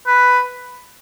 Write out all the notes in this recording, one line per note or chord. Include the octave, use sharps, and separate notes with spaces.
B4